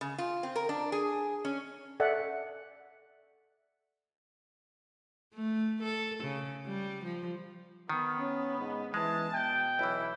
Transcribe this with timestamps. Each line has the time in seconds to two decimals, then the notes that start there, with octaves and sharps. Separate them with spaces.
0.01 C#3
0.18 F4
0.43 C4
0.56 A#4
0.69 D4
0.92 G#4
1.45 C#4
2.00 A4 D5 E5 F#5
5.34 A3
5.82 A4
6.23 C#3
6.66 G3
7.04 F3
7.89 D#3 B3
8.19 C#4
8.59 G#2
8.94 E3 G#3 A5
9.34 B2 G5
9.79 B1 E3 E4